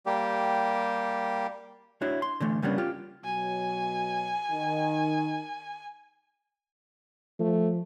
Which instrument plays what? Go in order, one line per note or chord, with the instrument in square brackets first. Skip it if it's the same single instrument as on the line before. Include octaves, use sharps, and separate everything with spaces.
[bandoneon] G3 A#3 G4
[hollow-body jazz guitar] D4 E4 F#4 C#5
C6
D3 E3 A3
C#3 G3 A#3 B3 C#4 D4
F4 G4
[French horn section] B2 F#3 [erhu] G#5
[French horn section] D#3
[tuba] F3 [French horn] A3